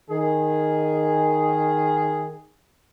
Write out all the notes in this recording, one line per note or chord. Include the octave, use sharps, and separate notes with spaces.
D#3 G#4